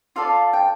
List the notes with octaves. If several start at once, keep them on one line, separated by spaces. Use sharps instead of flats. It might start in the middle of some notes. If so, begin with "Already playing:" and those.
F4 A4 D5 F5
G5